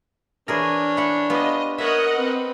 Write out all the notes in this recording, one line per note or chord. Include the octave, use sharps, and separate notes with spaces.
E3 D4 G#4 A#4 C#5
E4 F#5
B3 F4 G4 D#5
A#4 C#5 D#5 E5 F#5 D#6
C4 B4